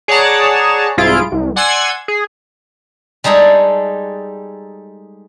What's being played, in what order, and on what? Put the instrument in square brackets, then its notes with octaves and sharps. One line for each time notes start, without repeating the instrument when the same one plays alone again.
[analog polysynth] G#4 C#5 D5 F#5 A5 A#5
C2 G#2 E4 F4 G#4 D7
C2
D5 F#5 G#5 C6 E6 G#6
G#4
[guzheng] G3 G#3 D#4 G#4 A4